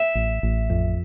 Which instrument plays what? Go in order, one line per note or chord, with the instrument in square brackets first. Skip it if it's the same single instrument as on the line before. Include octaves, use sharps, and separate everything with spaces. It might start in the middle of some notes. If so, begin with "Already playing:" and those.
Already playing: [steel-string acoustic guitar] E5
[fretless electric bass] A1
A1
F2